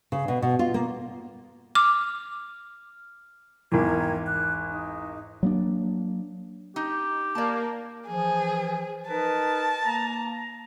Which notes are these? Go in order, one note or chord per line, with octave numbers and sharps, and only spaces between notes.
C#3
B2
B2
F4
A#3
D6 F6
G#1 E2 A#4 G5 G#6
F#6
D#4
F#3 A#3 D4
D#4 G4
A#3 D5 A5
E3 F3 G#4
D#4 A#4 B4 A5
A#3 A#5